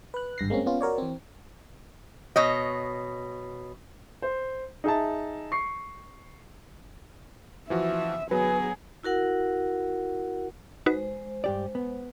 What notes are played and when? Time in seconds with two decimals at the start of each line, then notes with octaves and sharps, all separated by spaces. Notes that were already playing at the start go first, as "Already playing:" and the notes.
0.14 B4 F#6
0.38 G#1 G2 A#6 C7
0.50 G#3 A#3 C4 C#4
0.66 B3 C#4 F4
0.81 F#4 A#4 C#5 D5
0.98 E3 C4
2.36 B2 C#5 D#5
4.22 C5
4.84 D#4 G#4 E5 A5
5.52 C#6 C7
7.70 E3 F3 F#4 E5
8.31 F#3 B3 G#4 B4
9.03 E4 F#4 A#4 F#5
10.86 G#3 D#4 F#4 B4 C5
11.44 G2 G4 D5
11.75 B3